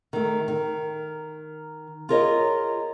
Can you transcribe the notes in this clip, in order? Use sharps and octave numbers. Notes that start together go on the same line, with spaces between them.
D#3 A3
D#3
F4 G#4 A#4 C#5 D#5